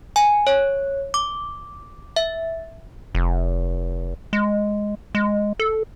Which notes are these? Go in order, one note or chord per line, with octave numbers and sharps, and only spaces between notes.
G#5
C#5
D6
E5
F1
G#3
G#3
A4